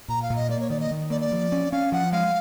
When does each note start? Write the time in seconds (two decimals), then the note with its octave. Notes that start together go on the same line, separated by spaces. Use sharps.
0.08 A#2 A#5
0.22 F5
0.30 A#2
0.36 D#5
0.49 A#3 D5
0.60 C#5
0.70 D#3 D5
0.80 D#5
0.91 D#3
1.10 A#3 D5
1.21 D5
1.32 F3
1.52 C#4
1.72 C#4 F5
1.92 F3 F#5
2.12 G#3 F5